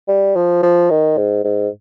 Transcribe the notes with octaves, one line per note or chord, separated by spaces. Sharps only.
G3
F3
F3
D#3
G#2
G#2